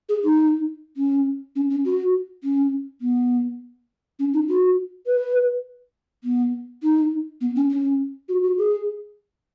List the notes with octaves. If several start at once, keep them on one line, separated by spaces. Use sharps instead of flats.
G#4
D#4
C#4
C#4
C#4
F#4
C#4
B3
C#4
D#4
F#4
B4
B3
D#4
B3
C#4
C#4
F#4
F#4
G#4